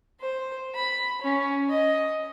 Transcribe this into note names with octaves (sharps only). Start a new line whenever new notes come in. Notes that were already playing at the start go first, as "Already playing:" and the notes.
C5
B5
C#4
D#5